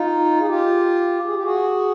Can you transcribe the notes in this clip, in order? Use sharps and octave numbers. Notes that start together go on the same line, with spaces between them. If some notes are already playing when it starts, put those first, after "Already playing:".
Already playing: D#4 F4
G#4
F4 G4
G#4
G4
F#4 G#4